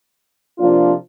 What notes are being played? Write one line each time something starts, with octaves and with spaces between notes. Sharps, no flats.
C3 F3 A#3 D4 F4